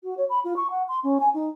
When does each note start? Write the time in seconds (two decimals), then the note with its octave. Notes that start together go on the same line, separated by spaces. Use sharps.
0.03 F#4
0.17 C#5
0.29 B5
0.44 F4
0.56 C#6
0.70 F#5
0.88 C6
1.03 C#4
1.20 G#5
1.34 D#4